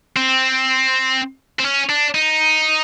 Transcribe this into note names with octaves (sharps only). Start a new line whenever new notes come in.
C4
C4
C#4
D4
D#4